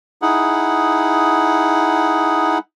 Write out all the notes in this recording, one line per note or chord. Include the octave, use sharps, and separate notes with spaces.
D#4 E4 G#4 F#5